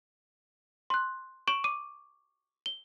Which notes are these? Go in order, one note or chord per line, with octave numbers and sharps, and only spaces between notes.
C6 F#6
C#6 D7 E7 F#7
D6 D#7
G7